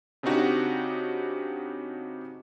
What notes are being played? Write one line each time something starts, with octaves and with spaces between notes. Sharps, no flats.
C#3 C4 D4 D#4 F#4 G4